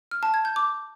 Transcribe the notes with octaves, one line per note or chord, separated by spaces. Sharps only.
F6
A5
G#6
G6
D6